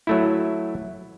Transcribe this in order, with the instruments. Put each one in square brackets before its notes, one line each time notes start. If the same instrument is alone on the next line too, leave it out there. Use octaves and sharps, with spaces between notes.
[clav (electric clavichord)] F#3 A3 E4